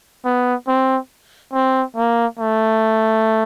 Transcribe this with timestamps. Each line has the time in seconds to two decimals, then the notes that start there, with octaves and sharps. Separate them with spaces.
0.25 B3
0.68 C4
1.53 C4
1.96 A#3
2.39 A3